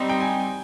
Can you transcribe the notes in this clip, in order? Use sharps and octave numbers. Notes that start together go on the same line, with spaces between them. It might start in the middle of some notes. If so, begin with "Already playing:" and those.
Already playing: G3 C4 D#4
G5
G#5